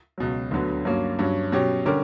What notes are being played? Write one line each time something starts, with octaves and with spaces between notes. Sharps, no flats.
C#2 B2 F#3
D2 D3 F#3 B3
G2 F#3 A#3 C#4
G2 F#3 C#4
B2 F#3 C#4 G4
D3 G3 C#4 G4 A#4